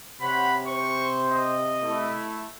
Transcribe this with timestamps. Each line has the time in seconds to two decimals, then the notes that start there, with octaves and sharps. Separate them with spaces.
0.21 C3 C5 C#5 F#5 B5
0.67 C5 C#6
1.32 D#5
1.82 A3 E4